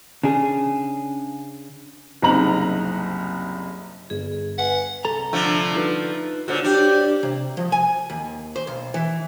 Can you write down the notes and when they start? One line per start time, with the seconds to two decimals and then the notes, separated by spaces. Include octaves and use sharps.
0.23 C#3 D4 G#4
2.22 F#1 C2 C4 D#4 A#5 F#7
4.10 G1 G#4
4.58 B4 F#5 G#5
5.05 C2 A4 A#5
5.33 D3 F3 A3
5.75 D#4 F4 B4
6.48 A#2 D3 F#4 C5 C#5
6.64 D4 G4
7.23 C3
7.57 F3
7.72 G#5
8.10 D#2
8.56 C5
8.67 B1
8.94 E3